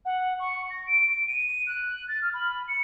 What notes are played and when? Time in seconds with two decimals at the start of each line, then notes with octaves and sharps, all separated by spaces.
0.05 F#5
0.39 C#6
0.70 A#6
0.86 D7
1.26 D#7
1.66 F#6
2.08 A6
2.21 F6
2.33 B5
2.68 C#7